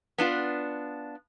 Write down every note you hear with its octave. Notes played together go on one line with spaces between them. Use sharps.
B3 D4 F4